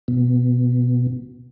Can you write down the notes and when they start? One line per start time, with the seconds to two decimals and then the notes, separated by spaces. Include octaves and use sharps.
0.08 B2